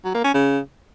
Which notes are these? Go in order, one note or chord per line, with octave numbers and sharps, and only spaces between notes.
F#3
A#3
C#4
C#3